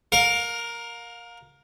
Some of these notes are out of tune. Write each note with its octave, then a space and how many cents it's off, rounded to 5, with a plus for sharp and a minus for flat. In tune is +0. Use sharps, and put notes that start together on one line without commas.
A#4 +0 F5 +25